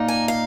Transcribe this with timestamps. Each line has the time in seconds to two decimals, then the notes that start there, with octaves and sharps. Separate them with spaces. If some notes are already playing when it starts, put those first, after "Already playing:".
Already playing: A#2 A#3 D#4
0.08 G#5
0.28 F5